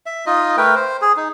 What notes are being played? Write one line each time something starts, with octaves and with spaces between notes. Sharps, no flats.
E5
D#4 F4 D#5
A3 A#4 B4 G5
C5
G#4
D#4